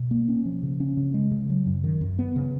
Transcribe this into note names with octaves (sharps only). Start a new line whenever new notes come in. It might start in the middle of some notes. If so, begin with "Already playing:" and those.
Already playing: B2
A#3
C#4
F3
C#3
C#4
C#3
G#3
C#3
F#3
F#2
D#3
F#2
B3
C#3